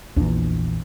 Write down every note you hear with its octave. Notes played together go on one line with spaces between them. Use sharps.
A#1 E2 D4